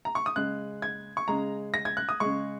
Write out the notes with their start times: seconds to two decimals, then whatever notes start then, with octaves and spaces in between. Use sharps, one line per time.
0.05 A#5
0.15 C#6
0.26 D#6
0.36 C#3 G#3 F#6
0.82 G#6
1.17 C#6
1.28 C#3 G#3 A#5
1.74 A#6
1.85 G#6
1.97 F#6
2.09 D#6
2.20 C#3 G#3 C#6